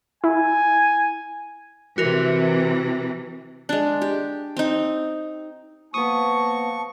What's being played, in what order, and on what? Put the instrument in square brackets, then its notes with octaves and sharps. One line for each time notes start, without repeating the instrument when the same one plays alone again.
[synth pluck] E4 [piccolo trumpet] G#5
[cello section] C3 E3 [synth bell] F#4 A#4
[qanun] G#3 D4
G4
C4 D#4
[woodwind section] F3 A#3 [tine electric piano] B3 D#6 [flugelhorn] A5 [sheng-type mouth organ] C#6